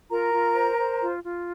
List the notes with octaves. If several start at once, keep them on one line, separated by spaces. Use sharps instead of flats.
F4 A#4 A#5
F4
C5
C5
F4
F4